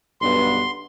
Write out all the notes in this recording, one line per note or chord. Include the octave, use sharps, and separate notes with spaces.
B1 G2 B3 C6